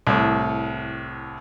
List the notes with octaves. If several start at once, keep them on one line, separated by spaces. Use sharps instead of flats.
C2 A2